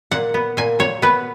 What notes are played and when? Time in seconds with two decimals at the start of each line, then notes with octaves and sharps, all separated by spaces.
0.11 A#2 F#5
0.34 B3
0.57 A#2 G#5
0.79 A#2 C#5
1.02 B3 B4